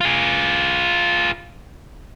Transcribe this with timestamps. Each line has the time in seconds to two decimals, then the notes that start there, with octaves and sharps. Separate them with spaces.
0.01 F4 G#4